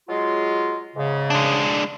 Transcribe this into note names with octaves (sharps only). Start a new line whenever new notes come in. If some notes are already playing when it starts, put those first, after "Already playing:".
F#3 G#3 F4
G#2 C#3
G#3 D4